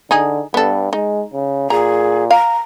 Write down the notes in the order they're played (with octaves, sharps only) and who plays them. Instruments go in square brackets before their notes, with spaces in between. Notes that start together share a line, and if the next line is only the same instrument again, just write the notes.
[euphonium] D3 [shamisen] D#4 G#4
[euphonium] G2 [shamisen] B3 A4
[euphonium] G#3 [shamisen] D#4
[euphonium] C#3
[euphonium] A#2 [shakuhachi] G#4 [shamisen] A#5
[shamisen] F5 [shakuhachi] A#5